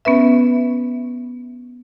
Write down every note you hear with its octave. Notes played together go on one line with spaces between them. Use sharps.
B3 C#4 B4 E5